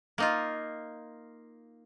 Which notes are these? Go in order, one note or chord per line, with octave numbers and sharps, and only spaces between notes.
A#3 D#4 F4